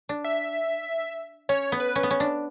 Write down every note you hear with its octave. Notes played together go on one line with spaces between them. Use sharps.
D4
E5
C#4 C#5
B3
B4
C#4
B3
C#4
D4